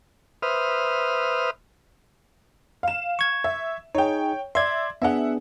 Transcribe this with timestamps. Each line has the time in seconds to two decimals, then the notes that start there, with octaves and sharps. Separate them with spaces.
0.42 B4 C5 E5 D#6 F6
2.83 F5 E7
3.19 C#6 G#6
3.44 E5
3.95 D#4 G#4 C#5 G5
4.55 D5 E5 C6 G#6
5.02 B3 D4 G#4 E5 F#5